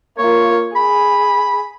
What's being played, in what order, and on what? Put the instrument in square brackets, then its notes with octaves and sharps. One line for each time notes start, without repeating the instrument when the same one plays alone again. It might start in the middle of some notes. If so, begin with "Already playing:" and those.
[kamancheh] A#3 F4 [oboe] C#5
[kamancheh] G#4 [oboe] B5